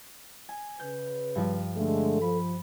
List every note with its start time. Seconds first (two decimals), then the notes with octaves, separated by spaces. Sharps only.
0.49 G#5
0.80 C#3 B4 G6
1.35 G2 F3
1.76 D3 G#3 A3 A4
2.21 F3 B5